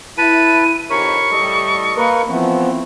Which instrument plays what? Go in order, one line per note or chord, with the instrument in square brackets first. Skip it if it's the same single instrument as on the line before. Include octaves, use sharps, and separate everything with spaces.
[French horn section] E4 [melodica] B4 A5 B5 [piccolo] D#7
[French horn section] F2 D#4 G4 [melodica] A#4 C#5 B5 [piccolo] C#6
[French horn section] A2 G3 [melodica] A4 D#5
[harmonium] A#3 A#4 B4
[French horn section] E3 C4 [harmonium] F3 B3 [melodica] A3